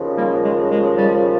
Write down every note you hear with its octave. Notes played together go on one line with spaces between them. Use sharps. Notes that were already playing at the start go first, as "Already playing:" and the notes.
Already playing: D#2 C#3 F3
G3 A#3
G#3
G#3
G3